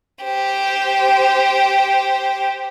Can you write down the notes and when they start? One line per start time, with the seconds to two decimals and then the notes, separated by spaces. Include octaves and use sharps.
0.24 G4 C5